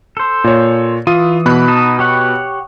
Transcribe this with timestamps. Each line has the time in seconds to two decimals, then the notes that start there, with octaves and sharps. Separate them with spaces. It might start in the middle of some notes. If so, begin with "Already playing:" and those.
0.17 A4 C5
0.44 A#2 C#5
1.07 E3 F4 D#6 D#7
1.46 B2 B5 F#6
1.68 D#4 D#5 A5
1.99 G4 C#5 F#5